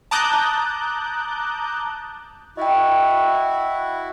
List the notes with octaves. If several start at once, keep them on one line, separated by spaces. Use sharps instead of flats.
A5 A#5 D6 D#6 F#6 G6
E4 F#4 D#5 G5